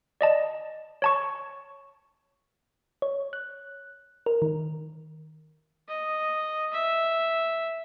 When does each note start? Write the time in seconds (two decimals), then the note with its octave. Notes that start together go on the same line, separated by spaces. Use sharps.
0.21 D5 D#5 A5
1.02 C#5 A5 C#6
3.02 C#5
3.33 F#6
4.26 A#4
4.42 D#3
5.89 D#5
6.73 E5